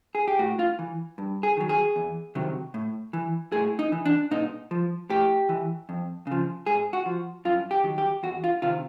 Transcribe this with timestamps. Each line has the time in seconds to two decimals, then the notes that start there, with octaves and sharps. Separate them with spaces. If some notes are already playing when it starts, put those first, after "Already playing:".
0.15 G#4
0.28 G4
0.39 A2 F#4
0.59 F4
0.79 E3
1.18 G2
1.43 G#4
1.57 D#3 F#3
1.69 G#4
1.96 E2
2.35 C3 D#3 F#3
2.74 A2
3.13 E3
3.52 A2 G#4
3.79 D#4
3.92 E3
4.05 D4
4.31 A#2 D#4
4.71 F3
5.10 A2 G4
5.49 E3
5.89 F2
6.27 C#3 F3
6.66 G#2 G#4
6.93 F#4
7.06 F3
7.45 F#2 F4
7.71 G4
7.84 D#3 F#3
7.98 G4
8.23 E2 F#4
8.44 F4
8.62 C3 D#3 F4